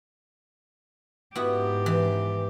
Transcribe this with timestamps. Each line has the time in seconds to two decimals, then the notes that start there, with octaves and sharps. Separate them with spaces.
1.36 G#2 B3 E4 F#4 G4
1.86 E3